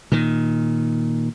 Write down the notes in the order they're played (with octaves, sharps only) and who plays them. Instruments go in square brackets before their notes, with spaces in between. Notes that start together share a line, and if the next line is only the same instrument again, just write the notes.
[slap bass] A#2 D#3